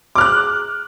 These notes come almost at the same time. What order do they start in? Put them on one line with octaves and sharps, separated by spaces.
D6 F6 F#6